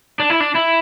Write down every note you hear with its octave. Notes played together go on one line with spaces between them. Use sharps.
D4
E4
D4
E4